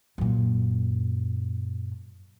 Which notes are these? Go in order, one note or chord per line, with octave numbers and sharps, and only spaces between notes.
F#2 A#2